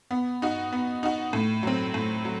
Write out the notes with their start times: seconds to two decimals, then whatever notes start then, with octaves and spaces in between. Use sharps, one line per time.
0.11 B3
0.42 D#4 F#4
0.72 B3
1.03 D#4 F#4
1.33 A2
1.63 F#3 C4
1.94 A2
2.25 F#3